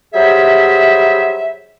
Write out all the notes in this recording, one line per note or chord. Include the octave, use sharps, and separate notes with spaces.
F#3 G3 G#4 C5 E5